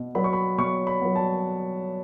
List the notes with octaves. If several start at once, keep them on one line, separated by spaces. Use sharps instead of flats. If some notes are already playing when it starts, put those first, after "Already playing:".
Already playing: B2
F#3 B3 B5
C#6
B5
B2 C#6
B5
F#3 B3
A5